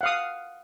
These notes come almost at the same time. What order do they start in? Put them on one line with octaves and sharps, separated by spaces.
F#5 F5 D#6